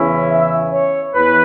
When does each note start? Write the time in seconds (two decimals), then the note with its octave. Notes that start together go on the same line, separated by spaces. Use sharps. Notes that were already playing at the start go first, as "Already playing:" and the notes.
Already playing: E2 C#3 E3 C#4 E4
0.26 E5
0.70 C#5
1.14 E2 E3 B4